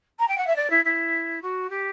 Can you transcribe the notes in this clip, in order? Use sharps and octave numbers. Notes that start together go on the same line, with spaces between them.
A#5
G5
F#5
E5
D5
E4
E4
F#4
G4